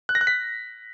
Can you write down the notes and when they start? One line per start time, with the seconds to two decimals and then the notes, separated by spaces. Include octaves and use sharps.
0.09 F#6
0.15 A#6
0.21 F#6
0.27 B6